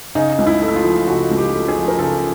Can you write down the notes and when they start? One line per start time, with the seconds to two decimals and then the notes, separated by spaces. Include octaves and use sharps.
0.15 C#3 D#4
0.38 C#2
0.47 E4
0.62 A3
0.68 E4
0.76 F4
0.84 F3
1.07 C#3 F#4
1.31 C#2
1.38 G4
1.53 A3
1.68 G#4
1.76 F3
1.88 A#4
1.99 C#3 A4